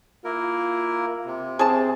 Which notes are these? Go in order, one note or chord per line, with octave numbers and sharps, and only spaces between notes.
A#3 E4 F4 A#4
C3
C4 G#4 A5